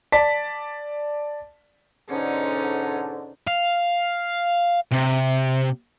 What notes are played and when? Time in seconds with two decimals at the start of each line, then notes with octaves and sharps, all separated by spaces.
0.12 D5 A5 B6
2.09 G#2 B2 D3 C#4 D#4
3.47 F5
4.91 C3